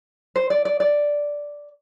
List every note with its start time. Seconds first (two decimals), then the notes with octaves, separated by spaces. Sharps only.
0.36 C5
0.50 D5
0.65 D5
0.80 D5